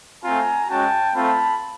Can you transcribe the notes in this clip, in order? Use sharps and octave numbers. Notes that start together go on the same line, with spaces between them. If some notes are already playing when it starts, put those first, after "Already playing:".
A3 C4 F4 G#5 A#5
G#3 C#4 F#4 G5 A5
A3 C4 F4 A5 B5